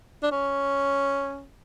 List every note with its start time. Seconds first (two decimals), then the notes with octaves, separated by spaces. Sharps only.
0.23 D4
0.31 C#4